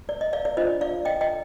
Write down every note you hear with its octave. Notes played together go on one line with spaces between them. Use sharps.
D5
D#5
D5 F5
D5
D4 F4 C5 D#5
D5 F5
D#5 G5
D#5 G5